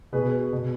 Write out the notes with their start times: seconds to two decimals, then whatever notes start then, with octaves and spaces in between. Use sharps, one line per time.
0.12 B2 G#4 B4
0.53 B2